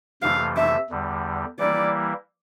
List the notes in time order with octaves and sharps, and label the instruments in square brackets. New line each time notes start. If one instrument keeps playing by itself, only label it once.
[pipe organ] F2 C3 E3 A3 [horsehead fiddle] F5
[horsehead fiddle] E5
[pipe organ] E2 D3 G3
[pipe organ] E3 G3 A#3 E4 [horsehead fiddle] D5